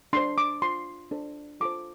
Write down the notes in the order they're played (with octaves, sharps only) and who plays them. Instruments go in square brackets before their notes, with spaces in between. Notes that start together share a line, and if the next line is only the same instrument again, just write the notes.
[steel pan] D4 A4 C5 C6
D6
F4 C5 C6
D4 A4 C5
F4 A4 C5 D6